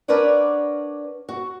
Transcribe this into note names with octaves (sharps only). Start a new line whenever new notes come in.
D4 A#4 B4 C#5 D5 F#5
F#4